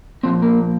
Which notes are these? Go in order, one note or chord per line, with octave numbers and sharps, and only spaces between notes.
A#2 F3 C4
A#3